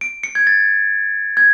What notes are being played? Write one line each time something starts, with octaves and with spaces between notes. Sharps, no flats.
D7
C#7
G#6
A6
G#6